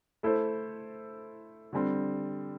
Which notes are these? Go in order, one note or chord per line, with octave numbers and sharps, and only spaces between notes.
A3 E4 A4 C5
D3 G3 C4